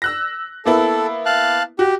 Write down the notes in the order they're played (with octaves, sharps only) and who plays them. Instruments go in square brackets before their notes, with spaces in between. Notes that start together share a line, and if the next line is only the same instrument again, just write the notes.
[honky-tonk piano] E6 F#6 A#6
[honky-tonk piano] A#3 B3 E4 [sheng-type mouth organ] A4
[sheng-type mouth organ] F5 A5 F#6
[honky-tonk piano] F#4 [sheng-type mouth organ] G4